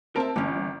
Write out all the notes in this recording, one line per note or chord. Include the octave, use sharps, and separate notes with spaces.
C4 A#4 E5 A5 D7
G1 E3 C#4